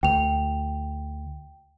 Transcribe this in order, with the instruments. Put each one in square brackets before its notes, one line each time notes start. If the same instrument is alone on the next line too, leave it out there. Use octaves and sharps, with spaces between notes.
[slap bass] D2 [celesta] G5 F7